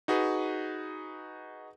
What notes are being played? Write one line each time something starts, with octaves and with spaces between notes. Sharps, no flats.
D#4 F#4 G#4 B4